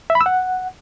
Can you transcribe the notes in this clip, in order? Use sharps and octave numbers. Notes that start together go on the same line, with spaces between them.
E5
B5
E6
F#5